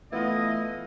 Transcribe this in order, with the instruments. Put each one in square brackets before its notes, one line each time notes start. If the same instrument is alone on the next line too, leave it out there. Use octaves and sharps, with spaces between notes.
[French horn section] E3 A3 [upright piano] B3 F4 [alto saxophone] E4 [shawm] D#5